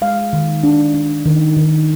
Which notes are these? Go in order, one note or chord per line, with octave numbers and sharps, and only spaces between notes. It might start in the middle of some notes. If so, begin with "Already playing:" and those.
G#3 F5
D#3
D4
D4
D#3
D#3